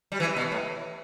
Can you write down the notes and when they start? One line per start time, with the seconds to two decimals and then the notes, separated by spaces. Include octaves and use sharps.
0.12 G3
0.20 E3
0.36 B2
0.52 A2